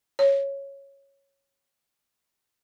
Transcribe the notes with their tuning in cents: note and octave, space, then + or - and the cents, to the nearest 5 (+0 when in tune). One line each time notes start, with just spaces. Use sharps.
C#5 -5